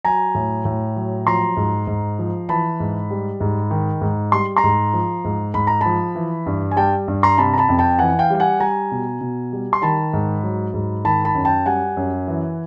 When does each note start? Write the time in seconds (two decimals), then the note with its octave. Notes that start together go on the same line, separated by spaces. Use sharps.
0.05 F#3 G#5 A#5
0.35 A2
0.65 A2
0.96 F#3
1.26 F3 A#5 C6
1.57 G#2
1.87 G#2
2.19 F3
2.49 E3 A5 B5
2.80 G#2
3.10 G3
3.40 G#2
3.71 D#3
4.02 G#2
4.32 G3 C6
4.57 A#5 C6
4.64 G#2
4.94 F3
5.25 G#2
5.54 G#2 B5
5.67 A#5
5.81 F3 A5 B5
6.15 E3
6.46 G2
6.71 G#5
6.77 G3 G5 A5
7.08 G2
7.23 A#5 C6
7.38 C3 A5 B5
7.54 A#5
7.58 A5 B5
7.69 F2
7.79 G5 A5
7.99 E3 F#5 G#5
8.19 F5 G5
8.30 G3 G5
8.40 F#5 G#5
8.60 G3 G#5 A#5
8.91 B2
9.21 B2
9.53 G3
9.73 C6
9.82 D#3 A5 B5
10.13 G#2
10.43 F#3
10.74 G#2
11.05 D#3 A5 B5
11.25 A5 B5
11.35 F#2
11.45 G5 A5
11.66 G3 F#5 G#5
11.97 F#2
12.28 E3